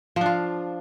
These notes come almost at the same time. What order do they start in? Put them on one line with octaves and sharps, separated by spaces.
F3 D4 F4